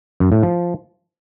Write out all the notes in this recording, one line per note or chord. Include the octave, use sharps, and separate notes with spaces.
F#2
A2
F3